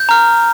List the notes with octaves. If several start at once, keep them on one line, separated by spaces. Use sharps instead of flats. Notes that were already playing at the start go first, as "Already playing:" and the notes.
Already playing: G6
A#5 F6